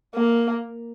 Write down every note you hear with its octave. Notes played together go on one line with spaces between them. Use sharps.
A#3